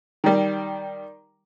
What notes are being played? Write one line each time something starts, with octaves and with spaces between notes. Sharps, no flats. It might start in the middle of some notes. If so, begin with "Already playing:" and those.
D#3 G3